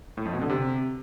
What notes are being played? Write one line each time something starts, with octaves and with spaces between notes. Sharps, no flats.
A2
F2
B2
D3
C3